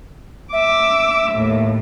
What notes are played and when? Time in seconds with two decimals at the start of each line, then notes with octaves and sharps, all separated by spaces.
0.52 E5 D6 E6
1.31 D#2 A2